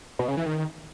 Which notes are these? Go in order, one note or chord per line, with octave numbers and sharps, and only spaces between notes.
B2
C#3
E3
D#3